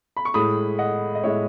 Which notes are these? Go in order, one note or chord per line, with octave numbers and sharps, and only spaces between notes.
B5
C#6
A2 G#3 B5 D#6
D#5 F#5
D#5
A2 G#3 C#5 E5